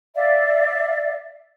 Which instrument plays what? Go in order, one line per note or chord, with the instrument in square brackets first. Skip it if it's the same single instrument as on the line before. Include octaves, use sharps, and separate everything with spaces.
[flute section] D5 E5 F5